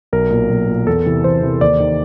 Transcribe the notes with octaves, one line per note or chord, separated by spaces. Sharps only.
B1 A#4
A#2
B1
A#2
E2 A4
C3 E3
E2 C5
C3 E3
D#2 D5
D#3